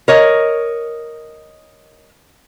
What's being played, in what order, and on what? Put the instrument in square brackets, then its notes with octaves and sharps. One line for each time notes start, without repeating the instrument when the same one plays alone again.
[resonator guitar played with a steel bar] A#4 C#5 D#5